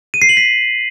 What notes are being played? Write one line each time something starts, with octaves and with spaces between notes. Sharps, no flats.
D#7
C7
F#7
B6